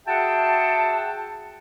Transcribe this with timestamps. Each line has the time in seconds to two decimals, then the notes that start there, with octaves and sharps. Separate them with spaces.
0.07 F#4 G#4 E5 F#5 G5 A5